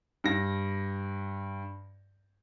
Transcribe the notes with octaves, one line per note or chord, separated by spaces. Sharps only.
G2 A#6